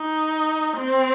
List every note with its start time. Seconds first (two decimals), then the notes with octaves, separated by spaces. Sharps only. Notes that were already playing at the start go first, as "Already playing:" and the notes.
Already playing: D#4
0.77 C4